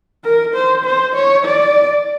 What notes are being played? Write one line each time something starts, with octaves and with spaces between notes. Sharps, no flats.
A#4
C5
C5
C#5
D5